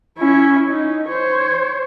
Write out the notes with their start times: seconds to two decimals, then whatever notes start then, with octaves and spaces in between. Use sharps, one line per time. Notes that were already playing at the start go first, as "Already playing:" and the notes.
0.18 C#4 E4
0.69 D#4
1.09 C5 C#5